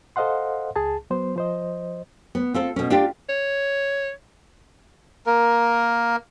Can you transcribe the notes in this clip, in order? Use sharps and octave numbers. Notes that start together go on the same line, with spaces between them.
A4 C5 D#5 F5 F#5 C6
C#2 G#4 A5
F#3 B3 C5 C6
F3 C5 D#5
B3
C4 F4 A4
B2 C#4
D4 F4 G4
C#5
A#3 A#4